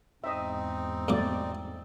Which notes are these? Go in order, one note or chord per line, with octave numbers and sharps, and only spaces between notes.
E2 G#2 C4 D#4 D#5 E5
G2 B2 A3 D5 D6